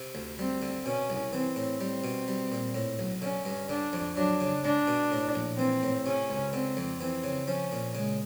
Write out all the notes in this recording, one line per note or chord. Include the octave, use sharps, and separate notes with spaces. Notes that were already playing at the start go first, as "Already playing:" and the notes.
Already playing: C3
D2
G3 C4
D3
B2 C#4
C2
E3 C4
A2
G3 C4
B2
G3
A#2
A2
B1
D3 C#4
G2
D3 D4
F2
F#3 D4
C#3
G#3 D4
B2
A2
A#1
E3 C4
A2
C3 C#4
C#2
D3 C4
F2
E3 C4
C#3
F3 C#4
A#2
C#3 G#3